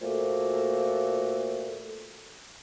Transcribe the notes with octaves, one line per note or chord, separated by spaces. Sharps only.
A#2 F3 A3 A#3 F#4 A4